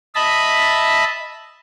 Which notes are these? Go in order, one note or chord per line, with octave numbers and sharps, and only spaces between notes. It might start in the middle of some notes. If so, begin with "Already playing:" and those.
D#5 E5 A5 B5